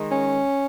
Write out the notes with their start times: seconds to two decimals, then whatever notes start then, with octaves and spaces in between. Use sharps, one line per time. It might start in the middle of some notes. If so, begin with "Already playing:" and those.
Already playing: D#3 G#3
0.12 C#4